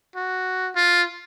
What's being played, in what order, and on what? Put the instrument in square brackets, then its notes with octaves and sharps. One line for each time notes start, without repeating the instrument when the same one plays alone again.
[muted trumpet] F#4
F4